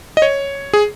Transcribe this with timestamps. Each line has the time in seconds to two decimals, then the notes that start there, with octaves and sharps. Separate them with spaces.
0.17 D#5
0.22 C#5
0.73 G#4